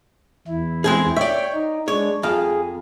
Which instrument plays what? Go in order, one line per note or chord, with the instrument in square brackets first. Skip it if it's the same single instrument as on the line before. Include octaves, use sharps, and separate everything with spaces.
[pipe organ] E2 E4
[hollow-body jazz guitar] G#3 C4 G#4
[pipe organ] C#5 G5 [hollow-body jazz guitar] D5 E5
[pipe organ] D#4
[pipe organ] G#3 D4 [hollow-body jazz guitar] C#5
[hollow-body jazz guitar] F2 F5 [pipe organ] G#4